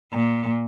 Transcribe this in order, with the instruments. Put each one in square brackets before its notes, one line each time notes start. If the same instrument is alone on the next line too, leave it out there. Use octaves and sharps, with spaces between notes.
[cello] A#2